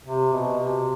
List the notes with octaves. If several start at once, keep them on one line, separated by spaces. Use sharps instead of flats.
C3
B2
C3